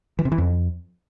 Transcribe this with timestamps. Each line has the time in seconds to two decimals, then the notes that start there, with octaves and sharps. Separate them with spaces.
0.19 E3
0.25 C3
0.32 E3
0.38 F2